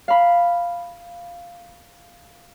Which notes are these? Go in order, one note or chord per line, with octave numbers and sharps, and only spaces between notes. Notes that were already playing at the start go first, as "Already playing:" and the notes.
F5 B5